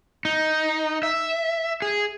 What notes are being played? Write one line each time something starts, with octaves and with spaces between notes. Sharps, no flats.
D#4
E5
G#4